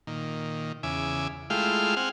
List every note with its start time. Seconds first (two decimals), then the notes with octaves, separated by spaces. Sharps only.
0.07 A#2 D#3
0.83 E2 C#3 E5 G#5 D6
1.50 G#3 A3 E4 F4 F5 G5
1.97 C4 F5 F#5 G#5